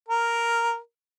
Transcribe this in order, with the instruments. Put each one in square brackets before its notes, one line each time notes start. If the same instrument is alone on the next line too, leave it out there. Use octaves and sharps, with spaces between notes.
[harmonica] A#4